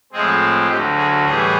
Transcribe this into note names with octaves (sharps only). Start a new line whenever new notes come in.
A2 F3 G#3 C4 G#4
D2 D3 F#3 G4
G#4
A2 E3 G3 G#4